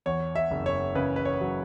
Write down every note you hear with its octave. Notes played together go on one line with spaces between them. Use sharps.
E2 C#5
E5
F#1
C#5
C#3 B4
B4
C#5
F#3